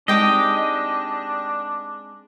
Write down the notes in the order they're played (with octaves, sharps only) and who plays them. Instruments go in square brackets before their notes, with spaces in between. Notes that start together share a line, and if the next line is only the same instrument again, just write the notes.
[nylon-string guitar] G#3 C4 D#4 [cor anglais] D4 [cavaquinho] G4 G5 D6 [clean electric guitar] D#5